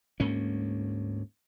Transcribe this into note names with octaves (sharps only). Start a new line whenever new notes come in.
D2 G#2 A#3 C#4